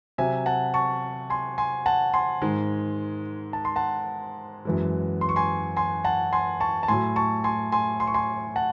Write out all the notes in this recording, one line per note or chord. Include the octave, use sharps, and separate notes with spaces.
C3 F#3 E5 G#5
F#5 A5
A5 C#6
G#5 C6
G#5 C6
F#5 A5
G#5 C6
G#2 D#3 G#3
A5
C6
F#5 A5
F#2 E3 G#3
C6
C#6
G#5 C6
G#5 C6
F#5 A5
G#5 C6
A5 C#6
A5
A2 F#3 G#5 C6
A5 C#6
G#5 C6
G#5 C6
C6
C#6
G#5 C6
F#5 A5